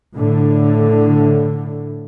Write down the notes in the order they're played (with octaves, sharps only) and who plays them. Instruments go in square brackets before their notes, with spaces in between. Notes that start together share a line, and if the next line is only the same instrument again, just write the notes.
[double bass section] A2 D3